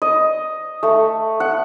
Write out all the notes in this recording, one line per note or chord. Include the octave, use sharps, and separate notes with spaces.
D#5
A3
F#5